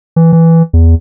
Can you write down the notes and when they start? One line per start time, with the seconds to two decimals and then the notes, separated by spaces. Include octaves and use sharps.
0.16 E3
0.33 E3
0.73 E2